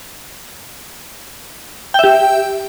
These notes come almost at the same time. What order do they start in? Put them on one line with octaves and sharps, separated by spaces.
G5 E5 G4